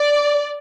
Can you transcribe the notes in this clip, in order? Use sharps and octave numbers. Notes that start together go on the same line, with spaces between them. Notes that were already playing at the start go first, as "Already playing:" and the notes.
Already playing: D5